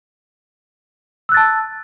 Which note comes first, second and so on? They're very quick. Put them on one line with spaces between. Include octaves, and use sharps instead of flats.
E6 F#6 A6 A5